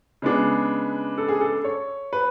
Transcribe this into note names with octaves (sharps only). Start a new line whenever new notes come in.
C#3 G#3 B3 D4
A4
G#4
A4
C#5
B4